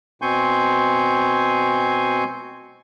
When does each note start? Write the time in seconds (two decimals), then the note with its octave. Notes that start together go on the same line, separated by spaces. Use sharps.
0.22 B2 C4 G#5 C6 C#6 G6